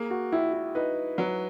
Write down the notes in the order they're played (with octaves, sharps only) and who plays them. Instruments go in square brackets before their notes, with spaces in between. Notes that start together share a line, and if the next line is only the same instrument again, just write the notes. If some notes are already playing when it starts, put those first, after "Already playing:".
Already playing: [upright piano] A#3 [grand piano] G#4
[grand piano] F#4
[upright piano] A#1 [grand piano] E4
[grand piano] E4
[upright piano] D#4 [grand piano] B4
[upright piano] F#3 [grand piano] B4